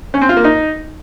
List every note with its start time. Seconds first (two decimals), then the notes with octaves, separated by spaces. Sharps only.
0.14 C#4
0.21 C4
0.29 F4
0.37 A#3
0.44 D#4